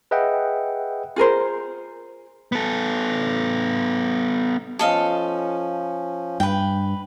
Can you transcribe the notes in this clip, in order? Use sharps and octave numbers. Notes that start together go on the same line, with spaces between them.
G#4 B4 D#5 E5 F#5 G5
F4 G#4 A#4 C5
B3 A4
F3 C#4 A4 D#5 F5
G2 B4 G5